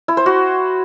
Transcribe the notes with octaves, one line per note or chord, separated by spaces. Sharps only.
E4
C5
F#4